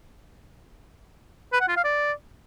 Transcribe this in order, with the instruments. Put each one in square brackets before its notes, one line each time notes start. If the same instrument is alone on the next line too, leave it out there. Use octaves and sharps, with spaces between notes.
[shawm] B4
F#5
F4
F5
D5